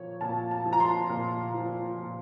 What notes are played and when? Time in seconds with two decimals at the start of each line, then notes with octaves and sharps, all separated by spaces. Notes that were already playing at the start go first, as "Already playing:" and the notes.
Already playing: A#2 F3 C#5
0.21 A#2 A5
0.51 A5
0.65 F3
0.73 A#5
0.80 C6
1.09 A#2
1.54 F3
1.98 A#2